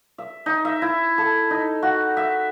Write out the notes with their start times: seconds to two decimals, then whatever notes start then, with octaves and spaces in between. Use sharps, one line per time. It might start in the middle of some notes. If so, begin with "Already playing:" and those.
0.18 E5
0.46 D#4
0.65 E5
0.82 E4
1.18 A4
1.51 D#4
1.82 F#4
2.17 E5